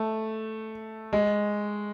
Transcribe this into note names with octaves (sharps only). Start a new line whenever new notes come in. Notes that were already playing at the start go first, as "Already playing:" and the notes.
Already playing: A3
G#3